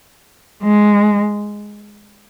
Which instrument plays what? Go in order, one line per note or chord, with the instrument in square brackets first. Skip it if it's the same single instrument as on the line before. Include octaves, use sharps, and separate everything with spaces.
[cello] G#3